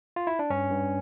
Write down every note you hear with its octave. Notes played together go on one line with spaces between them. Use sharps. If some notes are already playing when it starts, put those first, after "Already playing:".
F4
E4
D4
G2 C#4
G2